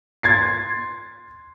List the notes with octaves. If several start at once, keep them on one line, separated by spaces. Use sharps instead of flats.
C6 G#6 A6 C7